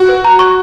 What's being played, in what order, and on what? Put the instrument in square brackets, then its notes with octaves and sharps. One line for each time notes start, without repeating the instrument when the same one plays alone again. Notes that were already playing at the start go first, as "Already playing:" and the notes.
Already playing: [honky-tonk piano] F#4
[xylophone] B4
A#5
C#6